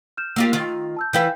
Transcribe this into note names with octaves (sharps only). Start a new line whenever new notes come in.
F6 G6 E7
A#3 F4 G4 E6
D#3 F4
A5 E6 G6
E3 E4 B4 F5 G5 G6